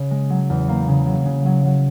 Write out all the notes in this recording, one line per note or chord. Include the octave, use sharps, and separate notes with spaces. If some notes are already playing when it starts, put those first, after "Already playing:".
Already playing: C#3
G#3
F#3
E2
A#3
C#3
F#3
C#3
F#3
F#3